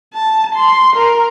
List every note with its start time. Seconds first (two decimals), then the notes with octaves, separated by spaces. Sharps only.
0.14 A5
0.55 C6
0.96 A#4